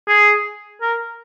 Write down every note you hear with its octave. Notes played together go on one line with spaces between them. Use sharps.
G#4
A#4